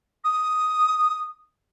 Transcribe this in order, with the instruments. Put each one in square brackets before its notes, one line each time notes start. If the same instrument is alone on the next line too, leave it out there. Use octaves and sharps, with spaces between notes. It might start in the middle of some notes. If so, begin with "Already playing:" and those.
[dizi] D#6